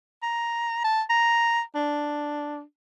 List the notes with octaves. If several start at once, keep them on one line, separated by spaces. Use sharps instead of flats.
A#5
A5
A#5
D4